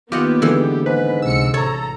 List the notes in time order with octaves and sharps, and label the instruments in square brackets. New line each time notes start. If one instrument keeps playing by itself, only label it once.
[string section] D#2 B3 [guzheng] F4 D#5 F#5 [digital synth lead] G4
[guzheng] D3 E3 G#3
[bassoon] G#2 [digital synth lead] B4
[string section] C#2 C3 C#7 [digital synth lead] E6
[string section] A1 A#5 [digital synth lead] A4 [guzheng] C#5